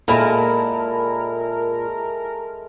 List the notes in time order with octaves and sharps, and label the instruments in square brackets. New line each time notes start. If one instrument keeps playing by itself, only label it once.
[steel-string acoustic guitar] A#2 [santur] G#3 E4 A4 [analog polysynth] A#4 [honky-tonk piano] A5 B5